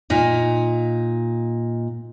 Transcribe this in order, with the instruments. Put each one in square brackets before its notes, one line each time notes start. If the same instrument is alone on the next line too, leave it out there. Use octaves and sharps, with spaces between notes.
[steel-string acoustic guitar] A#2 D#4